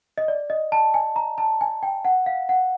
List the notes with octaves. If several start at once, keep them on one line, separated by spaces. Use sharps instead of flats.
D#5
D5
D#5
A5
G#5
A#5
A5
G#5
G5
F#5
F5
F#5